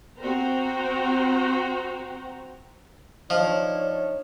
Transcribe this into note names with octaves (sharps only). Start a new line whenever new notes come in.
C4 F#4 C5 G5 A#5
F3 D4 D#4 C#5 D#5